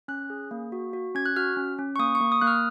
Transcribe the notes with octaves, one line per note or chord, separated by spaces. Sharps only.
C#4 F#6
G#4
A#3
F#4
F#4
C#4 G#6
F#6
F#4 F6
C#4
C#4
C#6
A#3 D#6
C#6
A#3
D#6
A#3 F#6
F6